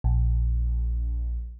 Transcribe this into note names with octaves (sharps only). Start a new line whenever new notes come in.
A#1